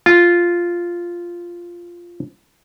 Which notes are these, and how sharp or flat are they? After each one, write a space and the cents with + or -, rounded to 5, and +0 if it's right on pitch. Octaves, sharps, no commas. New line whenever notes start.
F4 -5